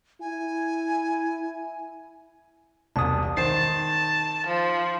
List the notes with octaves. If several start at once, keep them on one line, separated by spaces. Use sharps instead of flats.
E4 G#5
E1 C2 A5 D#6
D#3 D#4 C5 A5 C7
F3